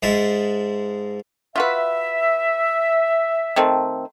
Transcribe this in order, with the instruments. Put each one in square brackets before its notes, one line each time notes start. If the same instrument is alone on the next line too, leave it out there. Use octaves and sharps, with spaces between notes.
[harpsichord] G#2 G#3 E5 A5
[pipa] F4 F#4 B4 [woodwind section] E5
[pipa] D#3 A3 C4